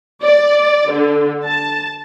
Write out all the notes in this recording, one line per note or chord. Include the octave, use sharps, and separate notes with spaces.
D5
D3
A5